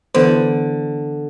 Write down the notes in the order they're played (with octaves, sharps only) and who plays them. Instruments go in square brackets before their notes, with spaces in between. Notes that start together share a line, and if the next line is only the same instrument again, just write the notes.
[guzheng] D3 [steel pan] E3 B3 C5